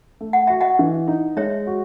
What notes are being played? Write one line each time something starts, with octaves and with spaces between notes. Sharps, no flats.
A3
F#5
F#4 E5
D#5 F#5
E3
D#4
G#3 C#5 E5
F#4